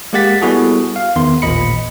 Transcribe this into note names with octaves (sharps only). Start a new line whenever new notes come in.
G#3 A#3 G4 F#5 A6 B6
G3 B3 E4 F#4 G#4 A4
F5
E2 D#3 B3 C6
A1 D#2 A#2 D#5 B5 C#7